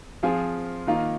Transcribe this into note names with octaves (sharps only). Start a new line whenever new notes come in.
F3 C4 F4 G#4
D#3 A#3 F4